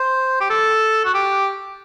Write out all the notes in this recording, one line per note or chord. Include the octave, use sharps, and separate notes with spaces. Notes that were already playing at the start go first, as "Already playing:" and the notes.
Already playing: C5
G4
A4
F#4
G4